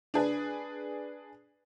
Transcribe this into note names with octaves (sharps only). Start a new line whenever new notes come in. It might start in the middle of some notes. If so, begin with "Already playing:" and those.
D4 G#4 B4